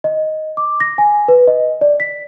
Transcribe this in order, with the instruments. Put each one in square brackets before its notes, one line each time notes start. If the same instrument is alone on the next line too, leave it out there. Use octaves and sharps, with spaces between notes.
[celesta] D#5
D6
A#6
G#5
B4
D#5
D5
B6